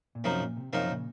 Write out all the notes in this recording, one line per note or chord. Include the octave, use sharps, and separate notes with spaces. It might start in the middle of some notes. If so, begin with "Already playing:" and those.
A#2
F#2 C3 F3 A#3 D#4
A#2
C3
F#2 C3 F3 A#3 D#4
A#2 C#3